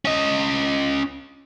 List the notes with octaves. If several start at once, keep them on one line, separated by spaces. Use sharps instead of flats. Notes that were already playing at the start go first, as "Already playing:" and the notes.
C#4 D#5